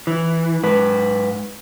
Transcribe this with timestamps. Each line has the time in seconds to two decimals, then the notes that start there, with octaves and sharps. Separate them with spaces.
0.07 E3
0.63 G#2 B4